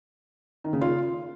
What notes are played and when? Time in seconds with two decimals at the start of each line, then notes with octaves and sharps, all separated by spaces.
0.64 D#3
0.73 C#3
0.81 F4